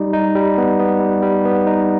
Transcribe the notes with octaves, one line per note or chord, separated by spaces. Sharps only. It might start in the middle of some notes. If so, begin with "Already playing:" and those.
Already playing: G3 D#4
D#4
G3
B3
B3
G3
G3
B3
D#4